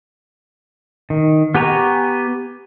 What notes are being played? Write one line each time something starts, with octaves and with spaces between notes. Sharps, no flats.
D#3
B3 G4 G#5 A#5 C#6